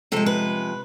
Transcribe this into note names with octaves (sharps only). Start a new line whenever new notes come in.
C3 F3 G#3 A4
B4